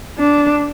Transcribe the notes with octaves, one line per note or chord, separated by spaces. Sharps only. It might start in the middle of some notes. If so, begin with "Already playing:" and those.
D4